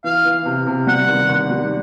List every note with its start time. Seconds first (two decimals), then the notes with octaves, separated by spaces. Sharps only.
0.04 E3 F5
0.25 E3
0.45 C3
0.66 C3
0.87 G3 F#5
1.08 D#2
1.29 D#2
1.50 G3